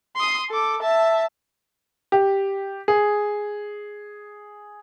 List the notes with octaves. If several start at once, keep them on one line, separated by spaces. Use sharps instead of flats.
C6 D#6
A4 D6
E5 A5
G4
G#4